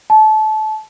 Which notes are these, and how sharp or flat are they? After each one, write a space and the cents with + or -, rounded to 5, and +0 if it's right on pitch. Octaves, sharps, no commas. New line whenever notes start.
A5 -25